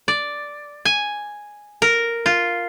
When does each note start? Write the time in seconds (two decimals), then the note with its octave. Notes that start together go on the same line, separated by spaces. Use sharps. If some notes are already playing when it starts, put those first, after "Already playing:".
0.08 D5
0.85 G#5
1.82 A#4
2.26 F4